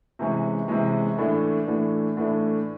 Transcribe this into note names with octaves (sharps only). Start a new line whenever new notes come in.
C3 E3 G#3 C#4
C3 E3 G#3 C#4
A2 E3 A3 D4
A2 E3 A3 D4
A2 E3 A3 D4